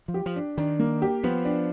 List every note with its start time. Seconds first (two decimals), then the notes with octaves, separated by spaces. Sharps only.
0.08 F3
0.14 G4
0.26 F3
0.36 D4
0.58 D#3 D4
0.79 A#3
1.02 G4
1.23 F3 B3
1.45 D4